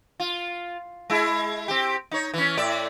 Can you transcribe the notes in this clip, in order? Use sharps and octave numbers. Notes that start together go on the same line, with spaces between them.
F4
G#3 E4
C4 G4
D#4 C#5
E3 C#4
A2 D5 E5